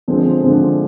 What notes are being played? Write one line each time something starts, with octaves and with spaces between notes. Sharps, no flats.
D3 F3 G#3 C4
D3 F3 G#3 C4